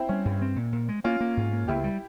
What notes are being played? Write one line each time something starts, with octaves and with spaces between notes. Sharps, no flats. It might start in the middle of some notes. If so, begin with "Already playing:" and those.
Already playing: C4 E4
G3 C#4
G2
C4
A#2
A#2
G#3
A#3 C#4 F4
A#3
G#2
A#3
C#2 E4 G4
G3